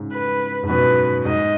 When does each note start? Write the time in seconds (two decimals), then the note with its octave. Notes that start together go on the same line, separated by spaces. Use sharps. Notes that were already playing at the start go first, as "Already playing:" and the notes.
Already playing: G#2 C#3
0.13 B4
0.63 G#2
0.69 F#2 B2 B4
1.25 G#2 D#5